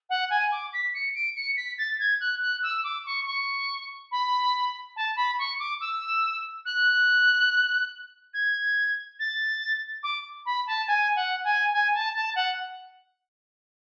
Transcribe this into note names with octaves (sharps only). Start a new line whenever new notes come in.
F#5
G#5
D6
B6
C#7
D7
C#7
B6
A6
G#6
F#6
F#6
E6
D6
C#6
C#6
B5
A5
B5
C#6
D6
E6
F#6
G#6
A6
D6
B5
A5
G#5
F#5
G#5
G#5
A5
A5
F#5